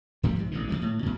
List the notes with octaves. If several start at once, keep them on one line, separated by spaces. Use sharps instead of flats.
A2 C3 F3 G3
C2 G#2
A1 B2 D3
G#2 C3 F3 G#3
A2
F#2 B2